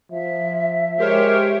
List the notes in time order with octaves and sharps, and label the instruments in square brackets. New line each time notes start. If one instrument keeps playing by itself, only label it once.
[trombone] F3 [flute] E5
[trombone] G#3 [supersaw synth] G4 C5 C#5 [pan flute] A#4